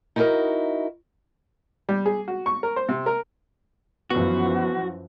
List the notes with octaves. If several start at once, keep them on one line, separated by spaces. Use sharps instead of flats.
D#4 E4 F#4 G#4 A#4 D#5
G3
G#4
F#4
C#6
A#4
C5
C3
A#4
F#2 E3 F3 B3 F#4